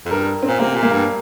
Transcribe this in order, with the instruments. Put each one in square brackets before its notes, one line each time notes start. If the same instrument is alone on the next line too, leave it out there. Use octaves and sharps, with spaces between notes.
[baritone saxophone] F2
[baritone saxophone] G2 [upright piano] A#4
[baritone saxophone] A#2 [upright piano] C4
[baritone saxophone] C3 [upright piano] A#3
[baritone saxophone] A#2
[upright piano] A#3
[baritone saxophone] G2